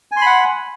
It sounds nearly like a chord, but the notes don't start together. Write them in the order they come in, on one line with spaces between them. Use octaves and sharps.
G#5 C6 B5 F#5